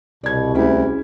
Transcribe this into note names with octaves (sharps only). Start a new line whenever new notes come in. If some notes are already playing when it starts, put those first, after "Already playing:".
C2 B2 D5 G#6
D2 G#3 C#4 E4